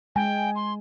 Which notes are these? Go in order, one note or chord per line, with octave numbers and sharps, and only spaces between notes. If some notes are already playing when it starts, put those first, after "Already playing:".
G#3 G5 G#5
C6